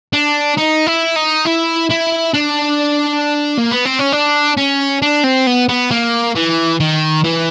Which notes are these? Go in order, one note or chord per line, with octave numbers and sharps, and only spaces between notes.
D4
D#4
E4
D#4
E4
E4
D4
A#3
B3
C4
C#4
D4
C#4
D4
C4
B3
B3
A#3
E3
D#3
E3